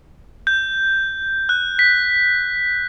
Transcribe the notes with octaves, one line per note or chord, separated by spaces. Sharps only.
G6
F#6
B6